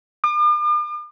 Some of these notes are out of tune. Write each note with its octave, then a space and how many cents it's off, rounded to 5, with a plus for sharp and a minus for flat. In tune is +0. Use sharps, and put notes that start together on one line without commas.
D6 +45